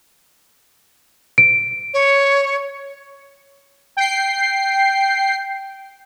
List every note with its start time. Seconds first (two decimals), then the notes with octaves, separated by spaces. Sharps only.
1.38 D7
1.94 C#5
3.97 G5 C7